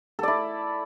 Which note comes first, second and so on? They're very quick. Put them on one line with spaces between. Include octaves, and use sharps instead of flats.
A4 D5 E4